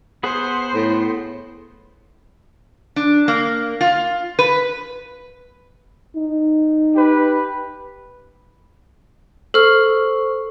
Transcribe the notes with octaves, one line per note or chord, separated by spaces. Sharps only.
B3 G#4 C5 F#5
A2
D4
A#3
F4
B4
D#4
G4 B4
A4 C5 C#6 F6